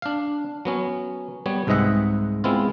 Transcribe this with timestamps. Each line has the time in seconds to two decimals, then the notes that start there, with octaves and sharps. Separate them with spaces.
0.02 D4 F5
0.65 F#3 B3 C#4
1.46 G3 B3 C#5
1.67 C2 G#2 G#3 D#5 E5 F#5
2.44 G#3 B3 C4 E4 F4